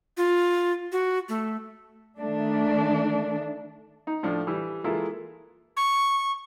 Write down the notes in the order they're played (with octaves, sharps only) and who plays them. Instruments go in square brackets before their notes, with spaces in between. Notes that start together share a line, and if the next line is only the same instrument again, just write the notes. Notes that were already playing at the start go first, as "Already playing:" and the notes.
[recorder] F4
F#4
A3
[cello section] D#3 A3 D4
[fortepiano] D#4
A2 F3 D4
E3 G3
E3 G#3 A#3 E4 F4 A4
[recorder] C#6